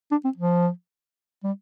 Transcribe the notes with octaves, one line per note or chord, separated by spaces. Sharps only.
D4
C4
F3
G3